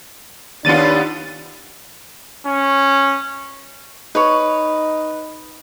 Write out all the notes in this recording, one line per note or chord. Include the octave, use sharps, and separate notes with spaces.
D#2 B3 D4 F4 A6 D#7
C#4
D#4 B4 C#5